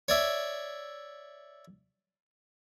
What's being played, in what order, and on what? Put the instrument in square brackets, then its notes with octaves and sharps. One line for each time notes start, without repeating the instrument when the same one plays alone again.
[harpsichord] C#5 D5 E5